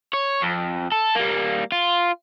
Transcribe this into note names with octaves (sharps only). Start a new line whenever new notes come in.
C#5
F2
A4
G3 A#3
F4